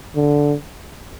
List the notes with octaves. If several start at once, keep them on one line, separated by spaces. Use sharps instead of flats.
D3